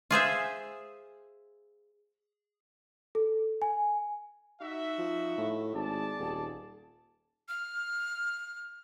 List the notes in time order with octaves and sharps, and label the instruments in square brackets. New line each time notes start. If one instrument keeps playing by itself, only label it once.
[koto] F4 G#4 C5 E5
[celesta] A4
G#5
[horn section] D#4 F#4 E5
[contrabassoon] F3
A2
[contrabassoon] G#1 [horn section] G#4 D5 A5
[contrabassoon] D#1
[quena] F6